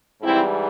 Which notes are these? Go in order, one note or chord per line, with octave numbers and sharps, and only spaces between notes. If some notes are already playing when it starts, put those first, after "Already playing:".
G#2 E3 G3 C4 E4